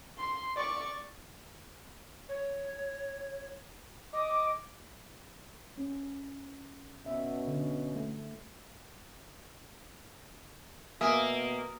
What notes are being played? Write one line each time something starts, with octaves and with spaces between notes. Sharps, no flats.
C6
D5 C#6
C#5
D#5 D6
C#4
B2 C#4 E5
D3
A3
B2 A#3 E5 G#5 D#6